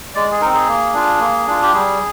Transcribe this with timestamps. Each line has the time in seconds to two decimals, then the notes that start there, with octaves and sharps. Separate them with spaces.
0.15 G#3 D5
0.32 G#4
0.41 C4 D#4 A#4
0.54 G#4
0.68 A#3
0.93 D4 F4
1.20 A#3
1.47 D4 F4
1.63 G4
1.73 G3 G#4